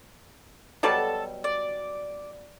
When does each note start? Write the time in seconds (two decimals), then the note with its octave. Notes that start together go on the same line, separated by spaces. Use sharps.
0.83 B2 F#3 G3 A4 A5
1.44 D5